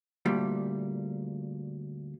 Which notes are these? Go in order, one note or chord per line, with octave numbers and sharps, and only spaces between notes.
D2 A#2 G3